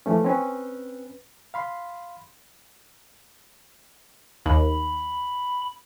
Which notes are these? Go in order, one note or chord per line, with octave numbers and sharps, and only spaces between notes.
E3 F3 A3 C#4
C4 C#4 B4
F5 B5 C6
D#2 B5